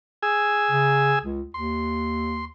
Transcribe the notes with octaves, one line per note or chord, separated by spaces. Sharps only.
G#4 G#5 E6
C#3
C#2
D#2 C6